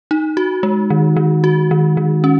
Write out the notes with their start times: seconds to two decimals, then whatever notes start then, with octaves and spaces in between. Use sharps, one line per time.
0.11 D#4
0.37 F#4
0.63 G#3
0.90 D#3
1.17 D#3
1.44 F#4
1.71 D#3
1.97 D#3
2.24 C#4